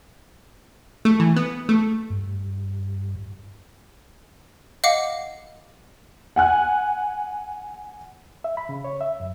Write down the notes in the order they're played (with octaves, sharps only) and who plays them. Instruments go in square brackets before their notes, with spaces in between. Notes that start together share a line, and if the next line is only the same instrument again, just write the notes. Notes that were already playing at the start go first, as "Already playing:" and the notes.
[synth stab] A3
E3
B3
A3
[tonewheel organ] G2
[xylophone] D#5 F5 F#5 D6 C#7
[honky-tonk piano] F#5 G#5 F#6
[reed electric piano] E5
B5
C#3
C#5
E5
F#2